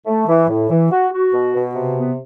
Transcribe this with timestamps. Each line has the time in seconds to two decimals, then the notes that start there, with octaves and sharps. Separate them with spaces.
0.06 A3
0.28 E3
0.49 A2
0.70 E3
0.91 F#4
1.12 F#4
1.34 B2
1.55 B2
1.76 C3
1.97 B3